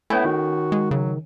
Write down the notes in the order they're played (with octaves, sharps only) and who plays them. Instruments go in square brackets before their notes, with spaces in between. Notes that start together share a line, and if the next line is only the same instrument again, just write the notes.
[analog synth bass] A3 [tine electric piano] B3 E4 [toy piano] C#4 C#5 G#5
[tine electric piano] D#3 [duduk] F#4
[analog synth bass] G#3
[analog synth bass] C#3 [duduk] F#3